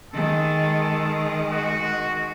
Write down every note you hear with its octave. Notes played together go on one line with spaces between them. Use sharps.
D#3 G#3 A4
F#4